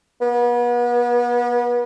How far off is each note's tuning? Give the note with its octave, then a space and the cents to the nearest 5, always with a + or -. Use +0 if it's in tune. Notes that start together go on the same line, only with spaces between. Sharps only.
B3 -35